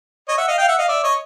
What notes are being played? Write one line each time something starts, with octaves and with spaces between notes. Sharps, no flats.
C#5 D#5
E5 F#5
D#5 F5
F5 G5
E5 F#5
D#5 F5
D5 E5
C#5 D#5